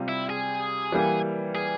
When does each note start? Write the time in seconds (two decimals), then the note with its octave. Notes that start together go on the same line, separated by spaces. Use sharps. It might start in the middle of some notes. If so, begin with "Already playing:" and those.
Already playing: C3 G3 C4 F4
0.08 E4
0.30 G#4
0.92 E3 G3 A#3
1.55 G#4